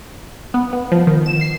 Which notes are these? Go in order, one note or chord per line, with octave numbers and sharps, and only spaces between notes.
B3
B3
F3
D#3
E7
C7